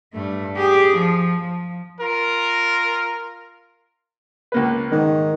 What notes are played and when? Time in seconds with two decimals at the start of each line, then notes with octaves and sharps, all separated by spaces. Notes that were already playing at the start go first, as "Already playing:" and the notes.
0.14 G2 A3
0.57 G4 G#4
0.97 F3
1.40 F3
2.00 F4 A#4
4.52 C#2 A#3 B4
4.92 G#2 D#3